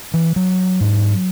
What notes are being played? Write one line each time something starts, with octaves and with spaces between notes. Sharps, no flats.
E3
F#3
G#2